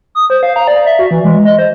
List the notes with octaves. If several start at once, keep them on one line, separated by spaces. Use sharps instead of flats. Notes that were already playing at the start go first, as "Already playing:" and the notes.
D#6
C5
F5
A#5
D5
E5
F#4
E3
G#3
D#5
C5